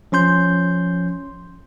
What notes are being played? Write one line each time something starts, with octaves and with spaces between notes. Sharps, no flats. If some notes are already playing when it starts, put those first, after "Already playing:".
F3 C#4 C6 G6